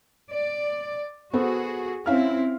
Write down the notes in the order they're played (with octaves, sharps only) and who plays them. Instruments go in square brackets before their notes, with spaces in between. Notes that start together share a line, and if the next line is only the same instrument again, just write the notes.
[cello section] D5
[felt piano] B3 A4 C5 [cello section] F#4 G#4
[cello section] C4 E4 [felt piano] C#4 F5 F6